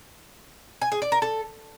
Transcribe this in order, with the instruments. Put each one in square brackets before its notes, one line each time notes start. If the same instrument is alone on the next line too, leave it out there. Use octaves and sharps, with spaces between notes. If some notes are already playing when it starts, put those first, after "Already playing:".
[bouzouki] G#5
G#4
D5
A#4
A4